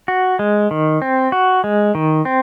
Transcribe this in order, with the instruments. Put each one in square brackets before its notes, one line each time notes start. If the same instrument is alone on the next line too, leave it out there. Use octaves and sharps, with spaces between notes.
[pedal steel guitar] F#4
G#3
D#3
C4
F#4
G#3
D#3
C4